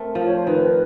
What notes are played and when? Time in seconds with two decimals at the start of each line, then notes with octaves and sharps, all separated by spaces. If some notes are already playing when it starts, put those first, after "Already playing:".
Already playing: A3 C4 A#4
0.15 F3
0.24 C#5
0.36 C5
0.46 D#3 B4